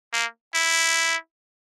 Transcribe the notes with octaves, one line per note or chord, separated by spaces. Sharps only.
A#3
E4